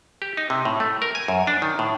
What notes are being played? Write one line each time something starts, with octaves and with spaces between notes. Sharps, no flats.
G4
D#4
C3
A2
A3
A#4
G#5
F#2
D4
D#3
A2